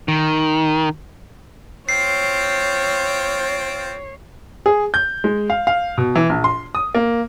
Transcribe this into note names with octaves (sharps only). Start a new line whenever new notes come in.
D#3
C4 F4 C#5 G5 C7
G#4
G6
G#3
F5
F5
B2
E3
A#1
C6
D#6
A#3